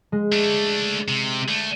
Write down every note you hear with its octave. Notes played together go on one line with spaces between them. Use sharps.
G#3
A3 D4
C3
D3 A3